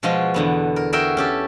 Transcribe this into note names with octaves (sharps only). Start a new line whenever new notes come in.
B2 F3 G#3 F4 F#4 D#5
E2 D3 B3
A#4
F#4 G#4 A#4 E5 G5
C#4 G4 A4